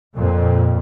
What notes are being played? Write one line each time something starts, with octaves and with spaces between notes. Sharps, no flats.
F2 A#2